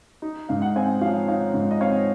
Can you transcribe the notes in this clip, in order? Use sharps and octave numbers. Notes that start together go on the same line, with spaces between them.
D#4
G#2 F5
F#5
C4 F5 G#5
F3 C#5 F5
D#4 C#5 F5
G#2
D#5
C4 C#5 F5